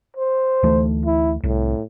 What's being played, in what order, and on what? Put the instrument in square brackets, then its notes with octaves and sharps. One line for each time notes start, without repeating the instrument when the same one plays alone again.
[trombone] C5
[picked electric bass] D2 E3 A3
[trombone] E4
[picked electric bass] C2 [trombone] A2